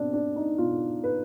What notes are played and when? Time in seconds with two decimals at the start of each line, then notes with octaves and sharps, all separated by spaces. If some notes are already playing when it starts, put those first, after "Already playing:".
Already playing: B2 C4 D4
0.13 D4
0.36 D#4
0.58 B2 F4
1.04 B4